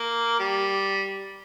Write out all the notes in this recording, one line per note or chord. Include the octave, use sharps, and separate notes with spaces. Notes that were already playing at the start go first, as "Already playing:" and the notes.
Already playing: A#3
G3